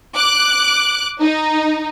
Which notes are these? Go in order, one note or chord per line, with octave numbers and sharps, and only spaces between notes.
D6 F#6
D#4